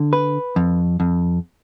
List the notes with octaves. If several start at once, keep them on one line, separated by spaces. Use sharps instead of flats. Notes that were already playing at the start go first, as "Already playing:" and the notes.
Already playing: D3
B4
F2
F2